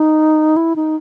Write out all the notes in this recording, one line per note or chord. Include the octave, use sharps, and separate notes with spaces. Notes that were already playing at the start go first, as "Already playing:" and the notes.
Already playing: D#4
E4
D#4